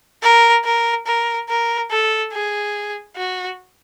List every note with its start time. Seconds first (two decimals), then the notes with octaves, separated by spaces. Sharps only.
0.22 A#4
0.65 A#4
1.06 A#4
1.49 A#4
1.91 A4
2.33 G#4
3.17 F#4